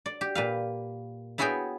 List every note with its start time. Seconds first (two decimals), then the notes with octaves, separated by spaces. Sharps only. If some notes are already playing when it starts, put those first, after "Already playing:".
0.06 D5
0.21 G4
0.35 A#2 B4 F5
1.38 B3 E4 F#4 G#4 C#5 G5